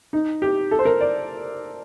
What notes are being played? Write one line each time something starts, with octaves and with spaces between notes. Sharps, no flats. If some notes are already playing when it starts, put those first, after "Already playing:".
D#4
G4
A4
C5
A#4
D5